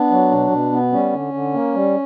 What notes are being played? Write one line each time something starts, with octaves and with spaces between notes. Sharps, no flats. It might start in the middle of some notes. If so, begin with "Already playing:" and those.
Already playing: B3 D4
F#3
B2
B2
B3
G3 C#4
D3
D3
A#3
G3